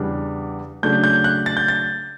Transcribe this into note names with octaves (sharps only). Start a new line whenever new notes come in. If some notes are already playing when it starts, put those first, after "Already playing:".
Already playing: E2 C#3 G3 D4
C#3 F#3 A3 D4 G6
G6
F#6
A6
G6
A6